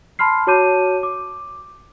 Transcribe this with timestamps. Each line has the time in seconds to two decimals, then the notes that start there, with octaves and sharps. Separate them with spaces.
0.19 A5 B5 C6 F6 C7
0.47 F#4 C#5 A5 D6 G6 D#7
1.03 D6